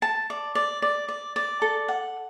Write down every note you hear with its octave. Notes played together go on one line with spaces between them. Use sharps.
A5
D5
D5
D5
D5
D5
A4
F#5